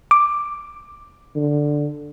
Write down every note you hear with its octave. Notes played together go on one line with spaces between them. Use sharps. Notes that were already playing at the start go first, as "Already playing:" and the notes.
D6
D3